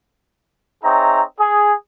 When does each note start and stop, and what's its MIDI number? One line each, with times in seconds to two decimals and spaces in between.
0.84 1.22 60
0.84 1.22 63
0.84 1.22 68
0.84 1.22 73
0.84 1.22 76
0.84 1.22 82
1.39 1.73 68